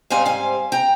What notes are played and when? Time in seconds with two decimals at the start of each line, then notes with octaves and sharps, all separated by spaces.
0.10 G#2 G3 C4 F5 G#5
0.26 F5 G#5
0.72 G5 A#5